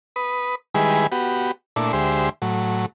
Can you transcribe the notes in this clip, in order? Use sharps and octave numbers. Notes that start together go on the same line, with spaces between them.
B4 D#6
D#3 G3 G#3 E4 G#4 B4
B3 F#4 G4
A#2 A3 D4 E4
D2 G#3 G4 C5 E5
A2 F#3